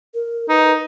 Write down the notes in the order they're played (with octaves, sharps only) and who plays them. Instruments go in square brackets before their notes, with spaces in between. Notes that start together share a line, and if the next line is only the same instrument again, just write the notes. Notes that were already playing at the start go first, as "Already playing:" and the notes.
[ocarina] A#4
[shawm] D#4 [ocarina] B4